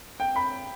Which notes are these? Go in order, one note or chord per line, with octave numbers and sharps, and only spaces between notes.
G5
B5